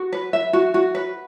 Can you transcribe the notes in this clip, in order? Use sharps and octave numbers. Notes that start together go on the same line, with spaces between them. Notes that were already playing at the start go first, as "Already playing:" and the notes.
Already playing: F#4
B4
E5
F#4
F#4
B4